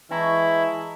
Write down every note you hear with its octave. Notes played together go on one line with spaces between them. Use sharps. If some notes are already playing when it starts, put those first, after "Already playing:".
E3 G#3 E4 A5 A#5 C#6